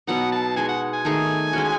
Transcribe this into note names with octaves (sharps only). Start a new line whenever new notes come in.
B2 F#3 B3 D#4 F#5
A5
G#3 D#4 F#4 G#5
F#5
G#5
D#3 A3 D#4 G#4
G#3 C#4 F#4